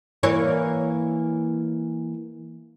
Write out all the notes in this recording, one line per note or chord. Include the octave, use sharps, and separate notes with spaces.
E3 A#3 C#5